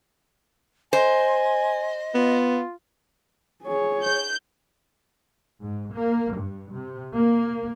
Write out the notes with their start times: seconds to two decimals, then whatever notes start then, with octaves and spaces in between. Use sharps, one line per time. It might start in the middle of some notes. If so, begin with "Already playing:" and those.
0.93 C5 D#5 G#5
2.14 B3 F4
3.64 G#4 C#5
4.02 G6
5.62 G#2
5.93 A#3
6.35 G2
6.73 C3
7.14 A#3